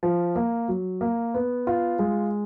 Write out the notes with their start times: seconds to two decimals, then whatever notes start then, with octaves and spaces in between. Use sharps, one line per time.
0.03 F3
0.36 A#3
0.68 F#3
1.01 A#3
1.34 B3
1.67 F4
1.99 G#3